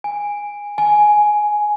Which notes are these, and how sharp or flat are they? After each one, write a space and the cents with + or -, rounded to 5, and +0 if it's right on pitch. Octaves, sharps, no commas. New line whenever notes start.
G#5 -15
G#5 +10